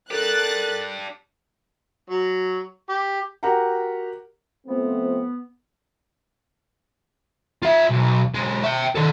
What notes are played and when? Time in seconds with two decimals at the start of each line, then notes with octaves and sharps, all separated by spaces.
0.11 D4 G4 A4 A#4 F#6 A6
2.10 F#3
2.89 G4
3.43 F#4 G4 A#4 F#5 A#5
4.67 F3 A3 B3 C4
7.63 F4 E5
7.90 B1
8.35 B1 G#3
8.63 E5 G5
8.95 D#3 A4